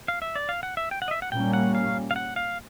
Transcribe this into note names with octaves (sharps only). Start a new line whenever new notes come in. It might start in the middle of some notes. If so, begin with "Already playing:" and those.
F5
E5
D5
F5
F#5
E5
G5
F#5
D#5
E5
F#5
A#2 G3 A#3 C#4 G5
F#5
F5
F5
F#5
F5